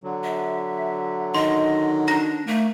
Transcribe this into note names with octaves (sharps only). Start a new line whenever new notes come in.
D3 F#3
E5
D#3 D#5 C6
D4 A#5 A#6
A3 A#3